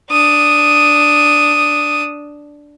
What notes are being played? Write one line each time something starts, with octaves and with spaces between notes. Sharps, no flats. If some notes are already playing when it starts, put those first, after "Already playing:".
D4 D#6